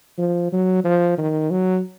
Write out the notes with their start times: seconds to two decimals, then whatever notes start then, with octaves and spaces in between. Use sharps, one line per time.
0.18 F3
0.52 F#3
0.84 F3
1.18 D#3
1.51 F#3